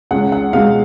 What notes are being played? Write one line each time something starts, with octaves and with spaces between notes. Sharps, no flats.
C#2 F#5
F#5
B2 G#3 F5